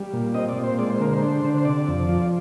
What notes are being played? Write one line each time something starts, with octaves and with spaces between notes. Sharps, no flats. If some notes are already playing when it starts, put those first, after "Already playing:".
Already playing: G3
A#2
C4 D#5
D5
A#2
C5
G#3 D5
C5
D3 A#4
C5
D4
D3
C5
C3 D5
F2
F3